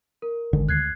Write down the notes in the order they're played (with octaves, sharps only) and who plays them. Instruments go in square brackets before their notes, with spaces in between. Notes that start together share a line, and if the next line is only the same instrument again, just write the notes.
[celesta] A#4
[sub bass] G#1 [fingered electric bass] D3 D#3 G#3
[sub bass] D2 [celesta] F#6 G#6 C7